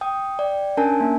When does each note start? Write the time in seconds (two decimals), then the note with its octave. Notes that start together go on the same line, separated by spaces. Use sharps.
0.01 G5 D#6
0.39 D5 G5
0.77 C#4 D4 A#4 G#5 A5
1.00 A#3